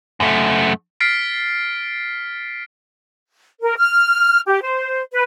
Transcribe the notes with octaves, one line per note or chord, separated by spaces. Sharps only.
F#2 A3
F6 A6 B6 C7 D7
A#4
F6
G4
C5
B4